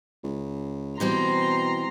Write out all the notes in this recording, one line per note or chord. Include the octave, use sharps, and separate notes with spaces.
C#2
B2 E3 G3 C4 A#5 C6